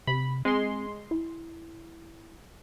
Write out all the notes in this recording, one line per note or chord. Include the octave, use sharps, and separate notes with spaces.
C3 B5
G#3 C4 C6
E4